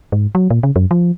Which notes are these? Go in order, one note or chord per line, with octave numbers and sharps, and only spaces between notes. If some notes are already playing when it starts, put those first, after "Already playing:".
G#2
F#3
A#2
C#3
F#2
F3